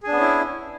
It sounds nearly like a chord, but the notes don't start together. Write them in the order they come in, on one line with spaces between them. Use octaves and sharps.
G#4 D4 B3 C#4 E4